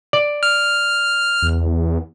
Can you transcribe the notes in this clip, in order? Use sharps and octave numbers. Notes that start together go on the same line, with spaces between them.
D5
F6
E2